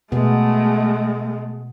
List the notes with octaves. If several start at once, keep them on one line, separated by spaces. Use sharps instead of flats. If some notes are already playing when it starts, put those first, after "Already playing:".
B2 G#3 A3 B3